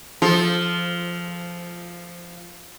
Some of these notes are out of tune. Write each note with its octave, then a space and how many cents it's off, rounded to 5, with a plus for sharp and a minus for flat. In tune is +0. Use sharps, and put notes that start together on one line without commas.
F3 -5 F4 +0 A4 -20